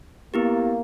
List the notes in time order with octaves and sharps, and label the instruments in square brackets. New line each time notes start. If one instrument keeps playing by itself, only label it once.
[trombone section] A#3 [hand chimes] B3 E4 G4